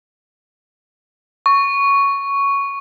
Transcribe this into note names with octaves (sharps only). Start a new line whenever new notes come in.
C#6